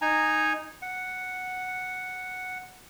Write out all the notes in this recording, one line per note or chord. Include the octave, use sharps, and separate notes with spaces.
D#4 G#5 A#5
F#5